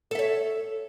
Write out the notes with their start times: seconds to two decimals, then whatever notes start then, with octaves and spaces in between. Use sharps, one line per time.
0.11 A4
0.15 E5
0.19 C#5